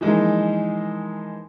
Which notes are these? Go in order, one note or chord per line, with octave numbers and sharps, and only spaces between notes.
E3 F3 G#3 A#3 D#4